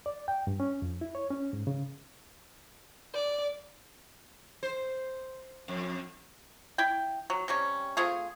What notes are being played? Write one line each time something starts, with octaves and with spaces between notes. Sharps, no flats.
D5
G5
G2
C#4
F2
E4
C#5
C#4
G#2
C#3
D5
C5
F2
E4 G5
F#3
C3 G3 C#4
A3 C4 F4 G#4